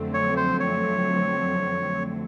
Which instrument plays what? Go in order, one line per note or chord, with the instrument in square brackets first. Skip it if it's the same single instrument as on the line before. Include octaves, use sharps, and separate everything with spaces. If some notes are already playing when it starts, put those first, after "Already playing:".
Already playing: [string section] F2 D3 F#3 A3 C4
[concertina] C#5
C5
C#5